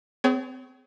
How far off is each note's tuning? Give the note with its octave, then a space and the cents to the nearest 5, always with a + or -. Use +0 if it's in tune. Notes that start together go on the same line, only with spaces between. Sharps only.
C4 -40 G#4 +20 C#5 +0